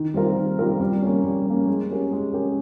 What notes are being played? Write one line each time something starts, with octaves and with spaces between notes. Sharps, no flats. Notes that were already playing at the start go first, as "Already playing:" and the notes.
Already playing: D#3
G3 C4 F4 A#4
D#3
G3 C4 F4 A#4
G3
A#3 C#4
G3
A#3 C#4
G#3
C#4 G4 A#4
G#3
C#4 G4 A#4